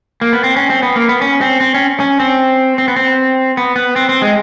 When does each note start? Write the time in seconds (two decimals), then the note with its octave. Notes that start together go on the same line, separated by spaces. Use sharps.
0.21 A#3
0.33 B3
0.44 C4
0.56 C#4
0.70 C4
0.83 B3
0.96 A#3
1.09 B3
1.21 C#4
1.41 C4
1.60 C4
1.74 C#4
2.00 C#4
2.20 C4
2.78 C4
2.88 B3
2.96 C4
3.57 B3
3.76 B3
3.96 C4
4.09 C4
4.22 G#3